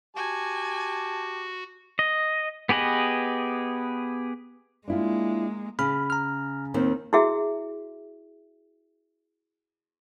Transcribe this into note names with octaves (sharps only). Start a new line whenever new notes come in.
F#4 G4 G#5 A5
D#5
B3 G4 G#4 B4 D#5
G#3 A#3 D4 E4 F4
C#3 B5 F6
A#5 F6
D#2 D#3 C4
E4 F#4 G#4 E5